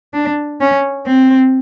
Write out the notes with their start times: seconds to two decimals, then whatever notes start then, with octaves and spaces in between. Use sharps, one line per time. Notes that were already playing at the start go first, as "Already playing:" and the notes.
0.14 D4
0.60 C#4
1.06 C4